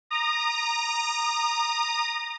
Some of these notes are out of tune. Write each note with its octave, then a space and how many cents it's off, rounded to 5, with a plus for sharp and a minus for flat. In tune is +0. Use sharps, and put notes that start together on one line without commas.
A#5 +0 D#6 -30